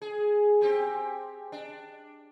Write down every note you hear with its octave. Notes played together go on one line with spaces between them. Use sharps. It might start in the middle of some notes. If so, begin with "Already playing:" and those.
G#4
C4 G4 G#4
D4